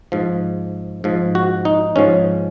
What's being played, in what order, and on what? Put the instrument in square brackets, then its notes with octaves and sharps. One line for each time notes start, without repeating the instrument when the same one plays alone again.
[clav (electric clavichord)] G#2 F3
G#2 F3
F#4
D#4
G#2 F3 C#4